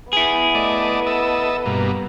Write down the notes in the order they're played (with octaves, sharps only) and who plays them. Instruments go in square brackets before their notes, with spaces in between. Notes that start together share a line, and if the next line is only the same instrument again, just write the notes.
[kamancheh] B3 [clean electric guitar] E4 G#4
[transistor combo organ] A3 D5 D#5
A4 D#5 E5
G2 B2 A#3